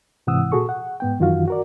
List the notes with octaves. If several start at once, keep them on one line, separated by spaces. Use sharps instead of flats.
G#2 C3 E3 F#5 D#6 E6
A#2 F#4 G#4 A4 C#6
F#5
G#2 B3 G5
F#2 D#3 E3 F4 F#4 F5
F#4 A#4 D5